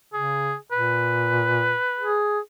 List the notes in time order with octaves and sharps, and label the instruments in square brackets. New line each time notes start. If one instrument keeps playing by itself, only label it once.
[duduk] C#3 [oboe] G#4
[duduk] A#2 [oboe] B4
[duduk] G#4